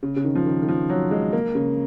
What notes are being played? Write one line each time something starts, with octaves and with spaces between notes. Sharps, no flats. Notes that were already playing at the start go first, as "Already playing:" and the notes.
C#3
C#3
D#3
F3
D#3
D#3
F3
F#3
G#3
A#3
C#3